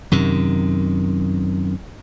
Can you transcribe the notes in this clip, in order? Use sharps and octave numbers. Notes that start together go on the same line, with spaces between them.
F#2 C3 D#3